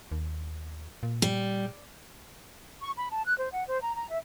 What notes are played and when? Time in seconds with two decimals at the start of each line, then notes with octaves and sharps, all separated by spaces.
0.12 D#2
1.03 A#2
1.22 G3
2.82 C#6
2.97 B5
3.11 A5
3.26 F#6
3.38 C5
3.52 F#5
3.67 C5
3.81 A#5
3.95 A#5
4.09 E5